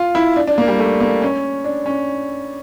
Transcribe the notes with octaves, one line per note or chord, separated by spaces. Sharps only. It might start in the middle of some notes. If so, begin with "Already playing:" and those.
Already playing: F4
E4
D4
D4
A#3
G3
A3
A#3
C#4
D4
C#4